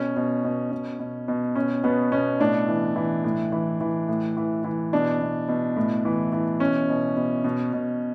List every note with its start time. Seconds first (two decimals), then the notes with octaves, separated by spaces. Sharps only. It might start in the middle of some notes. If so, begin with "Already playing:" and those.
Already playing: B2 C#4
0.16 B2
0.44 B2
0.72 B2
0.99 B2
1.28 B2
1.56 B2 C#4
1.84 B2 B3
2.12 B2 C#4
2.40 A2 D4
2.68 E3
2.96 E3
3.24 A2
3.52 E3
3.81 E3
4.09 A2
4.37 E3
4.64 E3
4.93 B2 D4
5.21 B2
5.48 B2
5.76 A2
6.05 E3
6.33 E3
6.60 B2 C#4
6.89 B2
7.17 B2
7.44 B2
7.73 B2